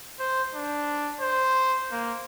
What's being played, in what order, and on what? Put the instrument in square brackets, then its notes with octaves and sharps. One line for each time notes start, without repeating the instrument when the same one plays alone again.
[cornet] C5
D4
C5
A#3